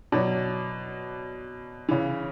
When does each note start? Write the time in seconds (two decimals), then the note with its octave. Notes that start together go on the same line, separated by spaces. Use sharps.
0.12 B2 F#3 D5
1.89 C#3 E3